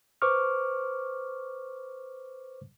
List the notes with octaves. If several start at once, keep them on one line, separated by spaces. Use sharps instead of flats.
B4 C5 C#6 D6 F6